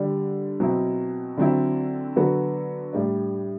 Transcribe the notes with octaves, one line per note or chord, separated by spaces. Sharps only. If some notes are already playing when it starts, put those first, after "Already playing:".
Already playing: D3 G3 D4
B2 F#3 C4 E4
D3 F#3 C4 E4
D3 F#3 B3 F#4 A4
A2 G3 D4